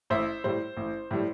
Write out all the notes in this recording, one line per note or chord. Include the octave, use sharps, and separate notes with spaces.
A1 C5 E5
A2 G3 C5
A1
A2 G3